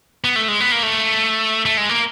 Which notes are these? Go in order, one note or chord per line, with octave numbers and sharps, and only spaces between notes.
B3
A3
G#3
B3
A#3
A3
A3
G#3
A#3